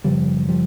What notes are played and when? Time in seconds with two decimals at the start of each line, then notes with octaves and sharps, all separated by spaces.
0.04 F#1 E2 C#3 F3 G3
0.49 F3 G3